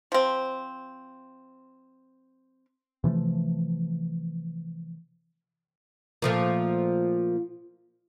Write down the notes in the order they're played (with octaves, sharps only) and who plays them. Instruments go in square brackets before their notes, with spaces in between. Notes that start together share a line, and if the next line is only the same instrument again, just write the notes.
[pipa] F3 C4
[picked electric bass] C3 E3 F3 A3
[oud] A#2 F3 A3